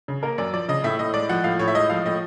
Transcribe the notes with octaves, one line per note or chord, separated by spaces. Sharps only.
C#3
A#3 A#4
F#2 D5
F3 D5
C#3 D#5
A2 E5
A2 D#5
G#3 D5
F3 F#5
A2 F5
A2 C#5
E5
G#3 D#5
F3 F5
A2 D#5